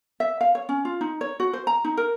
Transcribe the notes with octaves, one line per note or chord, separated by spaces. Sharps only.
E5
F5
C#5
C#4
F4
D#4
C#5
F#4
C5
A#5
D#4
A#4